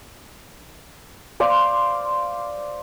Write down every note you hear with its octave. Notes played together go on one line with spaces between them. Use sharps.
C5 D5 F5 C6